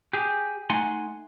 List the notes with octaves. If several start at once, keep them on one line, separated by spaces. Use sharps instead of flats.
G4 G#4
A3 D#4 F#5 G#5 C6